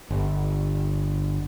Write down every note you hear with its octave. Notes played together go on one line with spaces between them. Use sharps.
G1